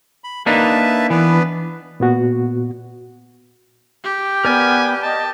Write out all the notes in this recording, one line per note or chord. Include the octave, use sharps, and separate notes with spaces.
B5
A#3 D4 D#4 B4 E5 A5
E3 B3 D4 B4
A#2 B3 F#4
G4
B3 A#4 D5 G#5 F6
D#5 A5